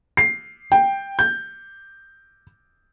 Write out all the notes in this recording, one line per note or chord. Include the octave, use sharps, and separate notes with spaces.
C7
G5
G6